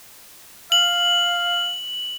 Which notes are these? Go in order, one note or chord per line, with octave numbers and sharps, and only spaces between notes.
F5 F#7